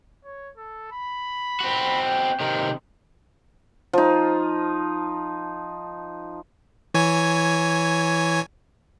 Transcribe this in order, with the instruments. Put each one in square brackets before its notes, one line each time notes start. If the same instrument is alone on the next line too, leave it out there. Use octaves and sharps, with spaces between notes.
[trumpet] C#5
A4
B5
[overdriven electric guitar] C4 F#4
[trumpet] G5
[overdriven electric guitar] C3 D#3
[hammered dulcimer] F3 D#4
[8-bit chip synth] E3 C#5 G#5